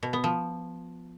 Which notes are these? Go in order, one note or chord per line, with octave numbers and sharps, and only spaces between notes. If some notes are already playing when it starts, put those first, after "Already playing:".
B2
B3
F3